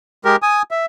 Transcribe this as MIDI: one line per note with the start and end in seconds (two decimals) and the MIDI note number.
0.25 0.36 56
0.25 0.36 67
0.25 0.36 70
0.42 0.62 80
0.42 0.62 87
0.71 0.86 76